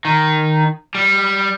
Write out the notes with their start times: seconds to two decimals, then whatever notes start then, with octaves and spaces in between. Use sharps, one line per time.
0.05 D#3
0.95 G3